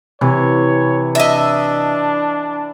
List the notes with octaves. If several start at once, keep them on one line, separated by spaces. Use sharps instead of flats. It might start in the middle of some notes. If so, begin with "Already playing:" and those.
C3 E3 C#5
D4 D#5 E5